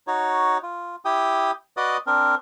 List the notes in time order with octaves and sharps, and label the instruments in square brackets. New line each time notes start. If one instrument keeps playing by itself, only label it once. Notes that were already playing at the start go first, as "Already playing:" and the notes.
[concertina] D#4 F#4 C#5
F4
E4 G4 G5 D#6
F#4 B4 D5 D#5 D#6
C4 D4 A#4